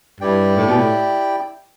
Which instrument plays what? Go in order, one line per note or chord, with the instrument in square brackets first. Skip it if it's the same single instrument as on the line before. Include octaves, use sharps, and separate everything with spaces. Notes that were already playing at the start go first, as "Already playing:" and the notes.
[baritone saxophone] G2 [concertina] E4 G4 D5 G5
[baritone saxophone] A2
B2
A2